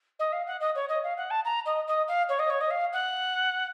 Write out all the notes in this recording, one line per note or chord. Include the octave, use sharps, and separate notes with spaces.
D#5
F5
F#5
D#5
C#5
D#5
F5
F#5
A5
A#5
D#5
D#5
F5
C#5
D#5
C#5
D#5
F5
F#5